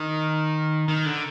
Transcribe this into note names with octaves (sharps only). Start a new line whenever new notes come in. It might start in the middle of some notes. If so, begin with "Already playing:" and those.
Already playing: D#3
D#3
D3